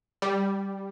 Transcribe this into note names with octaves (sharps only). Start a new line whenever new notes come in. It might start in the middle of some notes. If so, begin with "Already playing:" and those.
G3